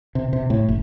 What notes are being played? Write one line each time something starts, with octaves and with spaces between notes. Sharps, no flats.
C3
C3
A2
F#1